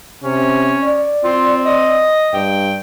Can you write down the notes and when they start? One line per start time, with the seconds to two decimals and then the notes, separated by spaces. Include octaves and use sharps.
0.23 C3 C#4
0.84 D5
1.24 C4 F4
1.66 D#5
2.34 G2 G5